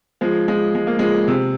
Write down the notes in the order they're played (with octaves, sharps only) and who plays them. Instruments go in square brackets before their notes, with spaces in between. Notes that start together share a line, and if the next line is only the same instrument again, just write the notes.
[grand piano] F3 G#3
F3 G#3
G#3
A#3
F3 G#3
C3